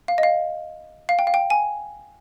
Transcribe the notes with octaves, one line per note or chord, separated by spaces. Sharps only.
F5
D#5
F5
F5
G5
F5
G5
G#5